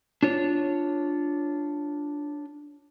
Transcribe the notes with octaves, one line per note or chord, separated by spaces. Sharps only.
D4 F4 C#5